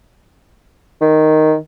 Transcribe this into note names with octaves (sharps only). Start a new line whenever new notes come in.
D#3